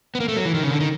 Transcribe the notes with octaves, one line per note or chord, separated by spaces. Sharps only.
B3
A#3
A3
F#3
E3
D#3
C#3
D3
D#3